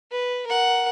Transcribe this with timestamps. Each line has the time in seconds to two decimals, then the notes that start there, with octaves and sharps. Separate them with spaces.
0.11 B4
0.46 A#4 F#5